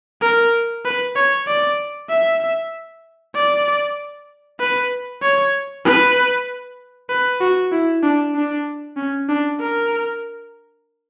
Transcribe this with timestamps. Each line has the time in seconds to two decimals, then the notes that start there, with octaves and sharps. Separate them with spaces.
0.22 A#4
0.85 B4
1.16 C#5
1.48 D5
2.10 E5
3.36 D5
4.60 B4
5.22 C#5
5.85 B4
7.09 B4
7.41 F#4
7.72 E4
8.03 D4
8.35 D4
8.97 C#4
9.29 D4
9.60 A#4